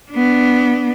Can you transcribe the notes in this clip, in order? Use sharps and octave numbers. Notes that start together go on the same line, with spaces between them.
B3 D4